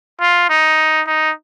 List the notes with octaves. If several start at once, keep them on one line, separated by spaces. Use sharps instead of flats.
F4
D#4
D#4